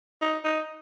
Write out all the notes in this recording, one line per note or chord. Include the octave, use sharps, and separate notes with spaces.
D#4
D#4